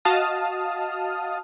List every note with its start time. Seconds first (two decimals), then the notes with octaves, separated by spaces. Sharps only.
0.05 F#4 D#5 F5 A5 D#6 F6